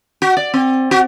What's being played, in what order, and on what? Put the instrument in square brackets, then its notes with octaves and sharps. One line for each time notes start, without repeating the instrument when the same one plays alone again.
[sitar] F#4
D5
C4
F#4